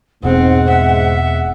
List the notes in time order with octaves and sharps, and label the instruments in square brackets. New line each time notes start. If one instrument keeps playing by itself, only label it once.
[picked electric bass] E1 B2 [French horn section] G#2 [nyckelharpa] C4 [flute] F#5
[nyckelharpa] E5